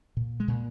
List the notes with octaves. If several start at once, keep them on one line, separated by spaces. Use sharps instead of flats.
A#2
G#3
A#2